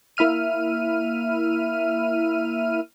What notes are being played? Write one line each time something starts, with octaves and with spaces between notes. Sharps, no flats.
A#3 E4 E5 F6 D#7